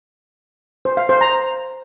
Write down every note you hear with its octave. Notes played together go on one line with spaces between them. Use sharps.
C5
F5
C5
A#5